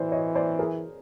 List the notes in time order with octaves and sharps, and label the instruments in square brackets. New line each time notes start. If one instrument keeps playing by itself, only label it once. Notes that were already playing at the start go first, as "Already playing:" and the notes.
Already playing: [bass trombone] E3 [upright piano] C5 D5
[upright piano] C#5 D#5
C5 D5
G#4 A#4